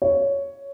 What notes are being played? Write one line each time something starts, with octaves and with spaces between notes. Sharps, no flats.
C#5